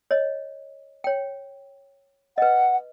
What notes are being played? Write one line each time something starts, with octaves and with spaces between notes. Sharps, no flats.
C#5 D#5
C#5 G5
B4 D#5 F#5